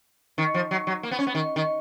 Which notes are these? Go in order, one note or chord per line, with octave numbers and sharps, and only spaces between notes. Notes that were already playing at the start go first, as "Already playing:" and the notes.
D#3
F3
F#3
F#3
A#3
B3
C#4
B3
D#3
D#3